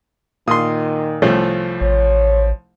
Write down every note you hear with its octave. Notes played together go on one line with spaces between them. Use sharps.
A#2 D#3 F4 C6 D#6
C2 F3 A3 C#4 C5
A1 C#5